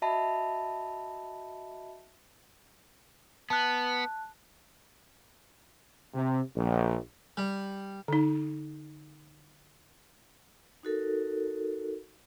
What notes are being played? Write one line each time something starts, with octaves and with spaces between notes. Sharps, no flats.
F#4 D#5 E5 A5 B5
B3 A5 F#6
C3
A#1
G3
D3 D#4
D#4 F#4 A4 A#4